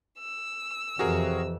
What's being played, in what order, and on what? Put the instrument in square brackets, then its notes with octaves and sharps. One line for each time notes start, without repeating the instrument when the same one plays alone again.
[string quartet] E6
[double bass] F2 E3 [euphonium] C3 [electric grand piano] F#4 G#4 A#4